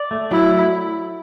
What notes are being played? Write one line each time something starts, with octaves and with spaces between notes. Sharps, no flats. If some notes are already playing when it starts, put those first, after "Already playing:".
Already playing: D5
A3
F#3 E4